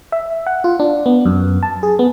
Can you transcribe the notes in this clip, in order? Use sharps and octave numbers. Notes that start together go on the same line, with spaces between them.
E5
F#5
F4
D4
B3
F#2
A5
G#4
B3